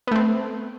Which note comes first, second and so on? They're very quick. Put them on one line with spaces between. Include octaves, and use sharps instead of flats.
B3 A3 C4